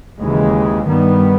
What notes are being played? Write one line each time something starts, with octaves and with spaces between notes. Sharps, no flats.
D#2 C#3 E3 G#3
G2 D#3 G3 B3